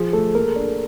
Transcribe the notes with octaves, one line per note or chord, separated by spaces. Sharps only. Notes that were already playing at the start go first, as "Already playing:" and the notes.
Already playing: F3 G#4
A3 A4
A#3 A#4
D4